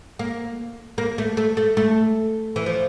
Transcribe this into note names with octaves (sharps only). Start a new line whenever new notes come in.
A#3
A#3
A3
A3
A3
A3
E3
F3